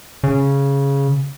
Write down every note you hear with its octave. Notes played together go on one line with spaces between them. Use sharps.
C#3